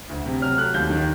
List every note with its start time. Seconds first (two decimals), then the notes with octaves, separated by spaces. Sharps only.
0.09 D2
0.26 C3
0.41 F#3 F6
0.57 A3 F#6
0.74 D#2 G6
0.90 D#3